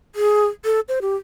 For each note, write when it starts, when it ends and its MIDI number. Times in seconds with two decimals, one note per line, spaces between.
0.15 0.47 68
0.65 0.80 69
0.88 0.99 72
1.02 1.16 67